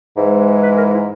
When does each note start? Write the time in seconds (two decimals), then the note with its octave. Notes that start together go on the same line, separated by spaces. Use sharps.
0.17 G#2 E3 G#3
0.63 B4
0.77 A#4
0.93 E4